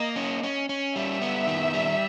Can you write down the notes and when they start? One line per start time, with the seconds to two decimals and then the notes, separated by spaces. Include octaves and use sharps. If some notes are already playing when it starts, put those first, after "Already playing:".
Already playing: A#3 D#5
0.16 C#4
0.43 C#4
0.69 C#4
0.95 G3 E5
1.22 B3
1.47 D#3
1.74 G3